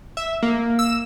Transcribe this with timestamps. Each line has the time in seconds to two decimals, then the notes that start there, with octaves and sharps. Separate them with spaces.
0.17 E5
0.43 A#3
0.79 E6